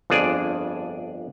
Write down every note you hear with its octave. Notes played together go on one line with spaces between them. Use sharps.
G1 F2 D4 G#4 D5 G#5